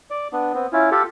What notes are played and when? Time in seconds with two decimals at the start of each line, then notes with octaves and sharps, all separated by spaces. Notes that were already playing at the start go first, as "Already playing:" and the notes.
0.10 D5
0.32 B3 D4
0.54 B3 C4
0.72 C#4 E4 F4
0.91 F4 G4 A4